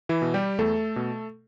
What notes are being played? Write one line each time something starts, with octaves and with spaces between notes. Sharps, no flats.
E3 E4
B2
G3 G4
E2 A3 A4
B2